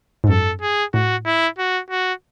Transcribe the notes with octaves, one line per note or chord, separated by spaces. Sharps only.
G#2
F#2 A4
G#4
A2 F#4
E4
F#4
F#4